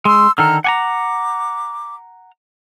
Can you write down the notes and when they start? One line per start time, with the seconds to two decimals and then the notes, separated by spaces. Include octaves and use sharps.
0.05 G#3 C6 E6
0.38 D3 D#3 A4 A#5 F6
0.64 F#5 G#5 A#5 D6